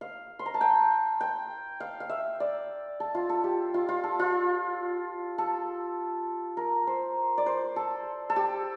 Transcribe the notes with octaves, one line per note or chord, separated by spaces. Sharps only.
F5
C6
A#5
A5
G5
G5
F5
F5
E5
D5
A4
F4
A4
G4
F4
F4
A4
F4
A4
A#4
C5
D5
C5
A4
A4
G4